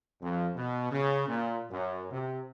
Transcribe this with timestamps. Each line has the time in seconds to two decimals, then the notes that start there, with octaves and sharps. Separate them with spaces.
0.22 F2
0.55 B2
0.91 C#3
1.27 A#2
1.71 F#2
2.11 C3